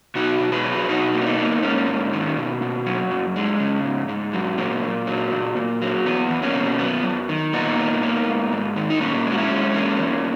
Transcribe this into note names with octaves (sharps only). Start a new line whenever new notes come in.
B2 D#4 F#4
B2
G#4 B4
F#3
B2 D#4 F#4
A#3
C#4
B3 D#4
A#3
G#2 A#3 C#4
G#2
D#3
B2
B2
F#3
F#2
G#3
C#3
G#2
G#2
F#3
A#2 A#3
A#2
F#3
A#2
A#2
F#3
E2 B3
E2
A#3 C#4
B2
F#2 B3
F#2
D#3
A#2 B3 D#4
A#3
A#3
G#2
G#2
D#3
D#4
A#2 A#3 C#4
G#3
F#4
C#4 E4
G#3
E2 A#3 C#4
E2